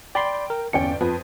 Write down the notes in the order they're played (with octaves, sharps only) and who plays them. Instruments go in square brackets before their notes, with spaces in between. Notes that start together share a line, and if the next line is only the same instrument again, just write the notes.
[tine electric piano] D5 B5 C6 [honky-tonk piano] G5
[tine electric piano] A#4
[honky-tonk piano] G1 D5 G5 [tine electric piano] E2 C#4 C#7
[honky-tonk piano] F2 [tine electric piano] B4